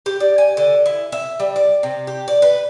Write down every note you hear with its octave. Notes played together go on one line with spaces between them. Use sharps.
G4
D5
G#5
D3
E4
E5
G3
D5
C3
G4
D5
B4